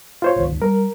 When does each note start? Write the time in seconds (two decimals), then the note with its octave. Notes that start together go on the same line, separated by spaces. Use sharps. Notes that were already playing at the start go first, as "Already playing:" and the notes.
0.22 F4 C5 C#5
0.36 G1 C#2 D#3
0.49 D#2
0.62 G3 A#4